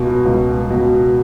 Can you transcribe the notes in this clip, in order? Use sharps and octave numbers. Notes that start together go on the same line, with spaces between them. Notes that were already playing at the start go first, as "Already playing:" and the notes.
Already playing: C#2 B2
C#2
B2